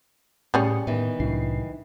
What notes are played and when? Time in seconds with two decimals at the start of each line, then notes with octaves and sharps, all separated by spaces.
0.54 A2 C#3 G3 C#4 D#6 C#7
0.87 A2 D#3 E3 B3
1.20 C2 A2 F#3 D4 E4 C7